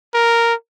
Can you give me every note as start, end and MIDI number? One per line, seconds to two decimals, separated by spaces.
0.14 0.54 70